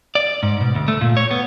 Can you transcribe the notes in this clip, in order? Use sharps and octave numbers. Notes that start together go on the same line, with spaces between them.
D5
G#2
B2
D2
A3
A#2
C#5
B3